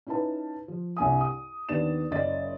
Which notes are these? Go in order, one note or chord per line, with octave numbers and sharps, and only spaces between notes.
C#4 D#4 E4 B4 A5
F3
C2 G2 G#5 D#6
D#6
D#2 B3 D4 A6 E7
F#1 F#2 D5 D#5 A6